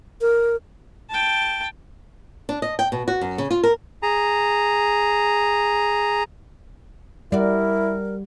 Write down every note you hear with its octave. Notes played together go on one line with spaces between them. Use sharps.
A#4
G5 A5
D4
D#5
G5
B2
F#4
F#2
C#3
F4
A#4
G#4 A#5
G3 E4 F#4 A#4 D5